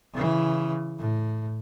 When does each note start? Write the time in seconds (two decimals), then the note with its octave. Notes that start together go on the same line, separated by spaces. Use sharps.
0.13 C#3 E3
0.98 A2